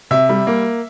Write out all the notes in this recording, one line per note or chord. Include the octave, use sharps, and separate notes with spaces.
C3 E5
G3
A#3